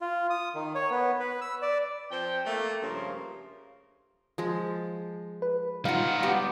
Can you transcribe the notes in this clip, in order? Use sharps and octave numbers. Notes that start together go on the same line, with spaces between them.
F4
D#6
D#3
C#5
B3
B4
E6
D5
F3 C4 C5 G5
A3 A#3
G2 C#3 F3 C#4 A#4 C6
F3 G#3
B4
G3 D#4 F4 F5 F#5
B3 G4